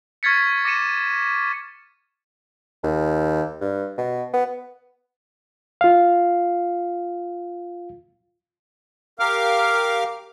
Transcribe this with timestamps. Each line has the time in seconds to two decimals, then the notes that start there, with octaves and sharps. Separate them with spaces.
0.23 C#6 F6 G#6 A6 B6 C#7
0.65 D6 A#6 C#7 D#7 E7
2.83 D#2
3.61 G2
3.98 B2
4.34 B3
5.81 F4 F5
9.19 G4 A#4 F5 D6 F6